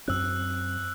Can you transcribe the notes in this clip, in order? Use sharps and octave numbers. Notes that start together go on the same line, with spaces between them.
F#2 C4 E6 F#6